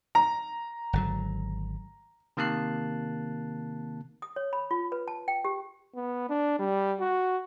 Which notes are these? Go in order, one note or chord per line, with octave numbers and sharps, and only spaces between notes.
A#5
G#1 D3 F#3
C3 D#3 A#3 A5 F#6 C7
D#6
C#5
B5
F4
B4
A5
G5
G4
B3
D4
G3
F#4